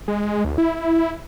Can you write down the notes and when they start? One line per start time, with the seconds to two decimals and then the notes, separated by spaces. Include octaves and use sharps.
0.08 G#3
0.45 D2
0.58 E4